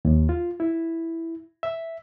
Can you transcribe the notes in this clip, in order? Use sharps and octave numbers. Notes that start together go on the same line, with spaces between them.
D#2
F4
E4
E5